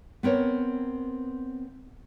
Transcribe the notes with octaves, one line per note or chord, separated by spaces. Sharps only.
B3 C4 A#4 C#5